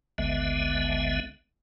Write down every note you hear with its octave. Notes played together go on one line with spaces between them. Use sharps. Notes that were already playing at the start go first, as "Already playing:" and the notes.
G#1 D2 D3 G#3 B3 E5